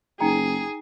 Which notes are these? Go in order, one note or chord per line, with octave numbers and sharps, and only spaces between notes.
F#1 D#4 G#4 G5 A#5